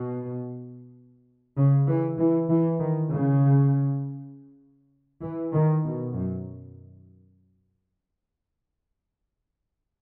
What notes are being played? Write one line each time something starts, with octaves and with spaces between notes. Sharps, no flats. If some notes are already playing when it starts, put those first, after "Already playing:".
Already playing: B2
C#3
E3
E3
E3
D#3
C#3
E3
D#3
B2
F#2